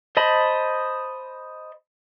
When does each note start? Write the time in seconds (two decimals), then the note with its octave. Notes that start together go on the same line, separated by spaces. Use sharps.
0.17 C5 D#5 A5 B5